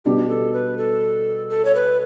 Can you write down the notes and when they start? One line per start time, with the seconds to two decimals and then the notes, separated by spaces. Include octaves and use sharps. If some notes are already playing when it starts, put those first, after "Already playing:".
0.05 B2 G3 B3 D4 G4
0.29 A4
0.53 B4
0.78 A4
1.50 A4
1.65 C#5
1.75 B4